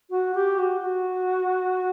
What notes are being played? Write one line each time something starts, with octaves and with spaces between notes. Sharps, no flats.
F#4
G4
F#4
F#4